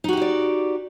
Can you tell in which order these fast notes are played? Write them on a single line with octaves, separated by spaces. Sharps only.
D#4 F#4 G4 E4 D5